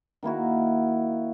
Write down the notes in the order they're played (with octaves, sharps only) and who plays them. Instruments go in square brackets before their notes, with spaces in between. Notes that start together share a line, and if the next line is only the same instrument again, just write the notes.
[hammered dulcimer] D#3 A#3 E4 F#4